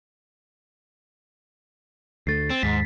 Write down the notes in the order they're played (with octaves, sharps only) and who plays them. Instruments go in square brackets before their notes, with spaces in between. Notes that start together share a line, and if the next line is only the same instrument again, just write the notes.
[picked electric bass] D2 A3 [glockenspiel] A6 C7
[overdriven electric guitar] C4
[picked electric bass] D#2 [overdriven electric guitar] G#2 [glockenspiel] B6